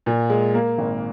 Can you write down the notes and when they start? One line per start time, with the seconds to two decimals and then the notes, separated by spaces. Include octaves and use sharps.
0.06 A#2
0.30 G#3
0.54 A#3
0.78 G#1